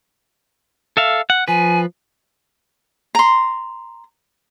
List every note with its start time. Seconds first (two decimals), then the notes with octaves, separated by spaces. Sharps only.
0.97 A4 E5 F5
1.30 F#5
1.48 F3 B4 G#5
3.15 A#5 C6